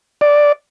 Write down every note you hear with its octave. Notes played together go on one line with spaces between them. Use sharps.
D5